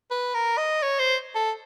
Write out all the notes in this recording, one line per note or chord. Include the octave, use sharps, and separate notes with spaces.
B4
A#4
D#5
C#5
C5
A4